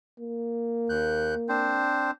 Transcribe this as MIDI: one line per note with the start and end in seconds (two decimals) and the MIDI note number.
0.19 1.97 58
0.90 1.35 39
0.90 1.35 90
0.90 1.35 91
1.49 2.11 60
1.49 2.11 62
1.49 2.11 72